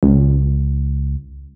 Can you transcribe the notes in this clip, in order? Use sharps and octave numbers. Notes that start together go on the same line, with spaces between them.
C#2